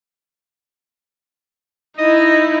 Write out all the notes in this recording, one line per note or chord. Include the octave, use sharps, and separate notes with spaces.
D#4 E4 D#5